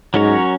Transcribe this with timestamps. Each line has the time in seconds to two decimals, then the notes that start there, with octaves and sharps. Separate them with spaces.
0.14 G#2 F#3 C#4 F#4 A#4 C#5